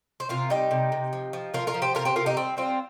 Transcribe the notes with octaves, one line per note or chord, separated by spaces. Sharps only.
C5
C3 F4 A#4
G3 D#4 G4
C3
C3
F3
F3
F3 F4 A#4
F4 A#4
F3
G4 C5
C3 F4 A#4
G4 C5
C3 F4 A#4
D#4 G4
G3 C4
G3 C4 F4